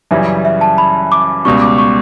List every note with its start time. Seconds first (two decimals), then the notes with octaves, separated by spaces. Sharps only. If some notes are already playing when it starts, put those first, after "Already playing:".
0.11 F#2 C#3 E3 G3 E5
0.45 E5
0.61 A5
0.78 B5
1.12 D6
1.45 C#2 B2 G3 C#6
1.62 D6
1.78 C#6